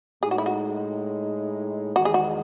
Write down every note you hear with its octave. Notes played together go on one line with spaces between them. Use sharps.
A2 G#3 D#4 G#4
F#4
E4
F#4
E2 D#3 G#3 F#4
G#4
F#4